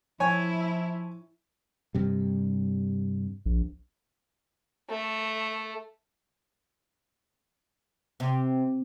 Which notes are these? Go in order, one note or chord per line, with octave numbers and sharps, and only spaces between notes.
F3 E4 C#5 G#5
G2 C3 G3
A#1
A3
C3